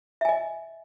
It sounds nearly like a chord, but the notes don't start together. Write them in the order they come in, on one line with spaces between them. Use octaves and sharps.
E5 G#5 D#5